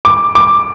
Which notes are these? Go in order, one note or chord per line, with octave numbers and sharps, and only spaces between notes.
D6
D6